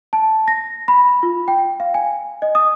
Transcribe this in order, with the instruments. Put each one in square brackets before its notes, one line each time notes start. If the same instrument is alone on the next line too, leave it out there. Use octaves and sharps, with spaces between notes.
[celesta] A5
A#6
B5
F4
G5
F5
G#5
D#5
D#6